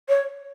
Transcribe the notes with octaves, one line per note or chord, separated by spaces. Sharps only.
C#5